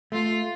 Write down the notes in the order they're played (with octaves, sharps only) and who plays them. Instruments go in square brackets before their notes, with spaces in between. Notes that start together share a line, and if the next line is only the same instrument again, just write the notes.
[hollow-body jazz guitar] A3 [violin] F4